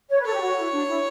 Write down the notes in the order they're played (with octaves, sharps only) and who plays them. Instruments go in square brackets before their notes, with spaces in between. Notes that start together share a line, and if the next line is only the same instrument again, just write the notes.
[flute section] C#5
B4
[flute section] A4 [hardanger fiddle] C#5
[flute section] G4
F#4
E4
D4
E4